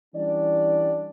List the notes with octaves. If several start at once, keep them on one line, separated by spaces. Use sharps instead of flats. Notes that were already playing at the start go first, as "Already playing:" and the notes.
E3 G3 C#4 D4 G4 D5